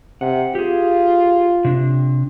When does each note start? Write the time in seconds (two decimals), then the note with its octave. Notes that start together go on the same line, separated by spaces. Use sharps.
0.21 C3 F#5
0.55 F4 G4 G#4
1.65 C3 D4